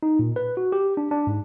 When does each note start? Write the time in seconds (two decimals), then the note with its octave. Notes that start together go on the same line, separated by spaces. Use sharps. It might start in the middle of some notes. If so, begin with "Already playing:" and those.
0.03 D#4
0.19 A#2
0.36 B4
0.57 F#4
0.72 G4
0.97 D4
1.11 D4
1.27 G#2